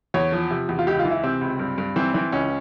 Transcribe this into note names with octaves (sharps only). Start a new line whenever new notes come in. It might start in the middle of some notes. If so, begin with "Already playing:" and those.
E2 C#5
F3
C3
E2
F4
C#2 G4
F4
E3
E4
C3 C4
C#2
G2
G2
E3 C4
E3 C4
C#2 C#4